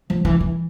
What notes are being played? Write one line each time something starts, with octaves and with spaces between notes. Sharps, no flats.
F3
E3
E3